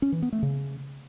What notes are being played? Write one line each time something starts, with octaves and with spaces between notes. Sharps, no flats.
C#4
E3
B3
A3
C#3